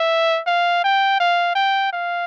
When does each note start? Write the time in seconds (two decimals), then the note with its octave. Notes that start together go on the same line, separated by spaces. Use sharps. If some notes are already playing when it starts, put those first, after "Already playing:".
Already playing: E5
0.46 F5
0.84 G5
1.20 F5
1.55 G5
1.93 F5